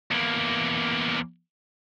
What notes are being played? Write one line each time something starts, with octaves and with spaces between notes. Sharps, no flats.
E2 A#3